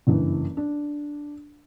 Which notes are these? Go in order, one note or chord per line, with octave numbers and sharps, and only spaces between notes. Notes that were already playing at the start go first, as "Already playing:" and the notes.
F#1 G2 E3
D4